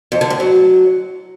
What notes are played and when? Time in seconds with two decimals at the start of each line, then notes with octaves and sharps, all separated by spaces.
0.12 F2
0.21 D3
0.30 A2
0.40 F#3